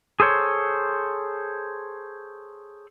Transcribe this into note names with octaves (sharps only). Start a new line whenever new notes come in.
G#4 A4 C5 C#5